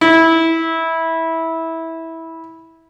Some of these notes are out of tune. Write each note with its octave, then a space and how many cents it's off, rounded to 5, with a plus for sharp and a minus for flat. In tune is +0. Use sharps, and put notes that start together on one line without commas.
E4 -15